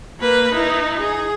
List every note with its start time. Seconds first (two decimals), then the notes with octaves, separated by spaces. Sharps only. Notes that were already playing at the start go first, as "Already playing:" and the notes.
0.20 A#3 B4
0.52 D#4 E4
1.00 G#4